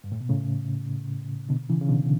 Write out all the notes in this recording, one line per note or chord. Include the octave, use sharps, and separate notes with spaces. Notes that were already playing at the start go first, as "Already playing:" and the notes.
G2
A2
B2
A2 C#3
B2 D3
C#3 E3
C#3
B2 D3